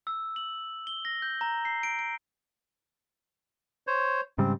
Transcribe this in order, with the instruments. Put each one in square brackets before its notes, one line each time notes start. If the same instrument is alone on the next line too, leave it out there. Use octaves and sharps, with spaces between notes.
[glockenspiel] E6
F#7
G7
A#6
G6
A#5
C7
D7
D7
[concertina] C5 C#5
[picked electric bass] G#2 C#3 G3 [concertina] C4